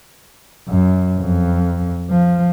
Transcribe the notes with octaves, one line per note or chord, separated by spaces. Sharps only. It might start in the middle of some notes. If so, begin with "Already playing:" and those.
F#2
F2
F3